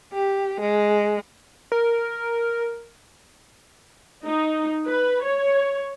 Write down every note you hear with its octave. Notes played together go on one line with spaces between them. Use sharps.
G4
G#3
A#4
D#4
B4
C#5